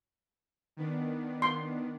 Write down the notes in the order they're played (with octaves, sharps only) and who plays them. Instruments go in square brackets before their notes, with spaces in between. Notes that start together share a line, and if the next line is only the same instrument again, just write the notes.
[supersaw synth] D#3 B3 D4
[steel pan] C6